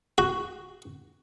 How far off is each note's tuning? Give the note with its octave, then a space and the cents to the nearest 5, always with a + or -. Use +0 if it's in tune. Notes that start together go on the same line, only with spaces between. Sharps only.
F#4 +5